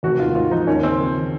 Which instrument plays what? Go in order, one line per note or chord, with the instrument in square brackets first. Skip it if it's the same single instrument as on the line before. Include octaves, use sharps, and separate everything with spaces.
[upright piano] F1 [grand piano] F#4
[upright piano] D#2 [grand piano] F4
[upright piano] G#2 [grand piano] F4
[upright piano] F3 [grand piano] D#4
[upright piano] D#2 [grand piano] C#4
[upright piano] C#3 [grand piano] C4
[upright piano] F2
D#3